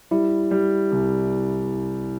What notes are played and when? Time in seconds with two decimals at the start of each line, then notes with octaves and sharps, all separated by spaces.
0.11 G3 E4
0.51 G3
0.91 C2